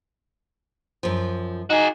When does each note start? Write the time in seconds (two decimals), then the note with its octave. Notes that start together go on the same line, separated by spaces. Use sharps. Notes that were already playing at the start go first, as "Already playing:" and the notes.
1.03 F#2 F3
1.70 D#4 F#4 G#4